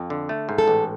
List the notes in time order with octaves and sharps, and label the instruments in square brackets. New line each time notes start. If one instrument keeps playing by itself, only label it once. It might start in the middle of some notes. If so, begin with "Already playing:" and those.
Already playing: [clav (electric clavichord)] F2
D3
A3
G#2
[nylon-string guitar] A4
[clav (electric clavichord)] A1